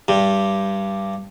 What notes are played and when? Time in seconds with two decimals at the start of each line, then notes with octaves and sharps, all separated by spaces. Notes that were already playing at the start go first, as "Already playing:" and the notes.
0.08 G2 G3